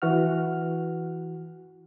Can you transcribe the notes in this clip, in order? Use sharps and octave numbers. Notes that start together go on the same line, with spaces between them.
E3 F#4 F#5 F6